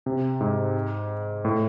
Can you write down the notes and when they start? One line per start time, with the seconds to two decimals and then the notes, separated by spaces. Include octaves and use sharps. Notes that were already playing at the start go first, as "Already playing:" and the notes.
0.06 C3
0.41 G#2
1.45 A2